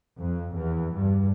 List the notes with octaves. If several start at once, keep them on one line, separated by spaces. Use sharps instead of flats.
F2
E2
G2